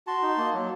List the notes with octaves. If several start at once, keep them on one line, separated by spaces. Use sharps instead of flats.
F#4 A5 C6
D#4
A#3
F#3